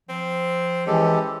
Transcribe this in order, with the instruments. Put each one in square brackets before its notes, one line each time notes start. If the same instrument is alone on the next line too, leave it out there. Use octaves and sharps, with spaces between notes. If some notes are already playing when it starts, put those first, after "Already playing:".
[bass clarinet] F3 [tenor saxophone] C4
[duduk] E3 [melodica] G#3 G4 A4 [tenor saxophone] C#4